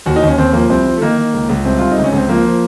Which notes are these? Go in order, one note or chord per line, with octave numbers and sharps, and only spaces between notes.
D#2 F#4
D#4
D#2 C#4
D#2 C4
F3 A#3
C2 C4
F3
A3
D#3 A#3
D#3
C#2
C#2
C2 C4
C2 F4
D#4
C#2
C#4
C#2 C4
F3 A#3
F3